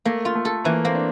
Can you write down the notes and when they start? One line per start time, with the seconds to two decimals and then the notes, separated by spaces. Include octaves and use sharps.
0.05 A3 A#3
0.25 F4
0.35 A3
0.45 A4
0.64 E3 A#3
0.84 A#3 C4
0.95 D4